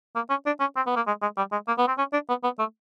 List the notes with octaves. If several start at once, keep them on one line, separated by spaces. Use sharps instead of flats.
A#3
C#4
D4
C#4
C4
B3
A#3
G#3
G#3
G3
G#3
A#3
B3
C4
C#4
D4
B3
B3
A3